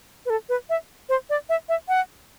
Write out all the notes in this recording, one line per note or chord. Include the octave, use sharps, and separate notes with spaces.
B4
A4
B4
E5
C5
D5
E5
E5
F#5